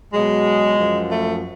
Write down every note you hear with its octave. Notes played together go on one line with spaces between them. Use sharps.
B2 F#3 G#3
F#2 F3
A3